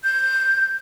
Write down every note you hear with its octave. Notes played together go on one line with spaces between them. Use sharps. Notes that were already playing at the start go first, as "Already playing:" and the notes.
G6